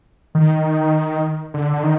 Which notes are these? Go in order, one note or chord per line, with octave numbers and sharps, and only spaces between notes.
D#3
D3
D3
D#3